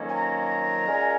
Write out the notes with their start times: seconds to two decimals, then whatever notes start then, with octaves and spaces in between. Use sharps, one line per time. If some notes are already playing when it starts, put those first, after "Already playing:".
Already playing: F2 D#3 F#3 A#3 C#4
0.08 G#5
0.13 A#5
0.85 A#2 G#3 C#4